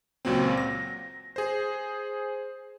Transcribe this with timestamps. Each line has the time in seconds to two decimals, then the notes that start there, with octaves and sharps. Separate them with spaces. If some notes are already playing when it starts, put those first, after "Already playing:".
0.25 C#2 A#2 F#3 A#3 C4
0.57 A#6
1.36 G#4 C5